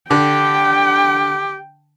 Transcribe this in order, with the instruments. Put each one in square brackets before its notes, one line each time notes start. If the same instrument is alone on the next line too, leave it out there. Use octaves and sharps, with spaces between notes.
[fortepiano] D3 [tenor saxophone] G4 [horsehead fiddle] G5